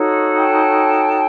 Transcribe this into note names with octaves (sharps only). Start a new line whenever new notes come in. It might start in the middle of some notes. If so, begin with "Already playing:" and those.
Already playing: D#4 F#4 A4 C#5
G5 A5